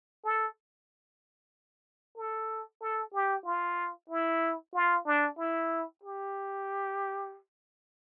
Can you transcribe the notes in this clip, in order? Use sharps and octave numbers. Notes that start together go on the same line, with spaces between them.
A4
A4
A4
G4
F4
E4
F4
D4
E4
G4